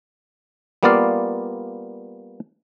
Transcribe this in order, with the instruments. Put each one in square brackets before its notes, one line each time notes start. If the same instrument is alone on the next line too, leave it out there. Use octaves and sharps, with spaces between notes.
[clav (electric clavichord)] G3 A#3 B3 F4 D5 F5